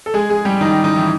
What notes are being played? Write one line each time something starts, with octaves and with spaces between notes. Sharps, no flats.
A4
G#3 G#4
G#3 G#4
G3 G4
D#3 D#4
D#3 D#4
E3 E4